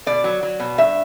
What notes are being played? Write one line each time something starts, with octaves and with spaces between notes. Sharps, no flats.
B2 D5
F#3
F#3
B2
G2 E5